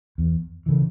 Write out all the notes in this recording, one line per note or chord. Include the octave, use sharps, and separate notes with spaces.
E2
C#3 E3